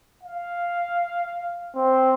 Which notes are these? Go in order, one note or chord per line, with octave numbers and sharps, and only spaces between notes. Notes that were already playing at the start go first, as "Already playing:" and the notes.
F5
C4